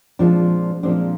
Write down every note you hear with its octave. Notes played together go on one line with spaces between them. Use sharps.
A#2 F3 G#3 C4 D4
A#2 F3 G#3 C4 D4